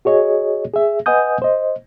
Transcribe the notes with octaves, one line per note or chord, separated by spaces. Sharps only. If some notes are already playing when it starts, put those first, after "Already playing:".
F#4 G#4 C#5 D#5
G#4 E5
B4 D#5 F#5 G#5 D#6 G6
C5 D#5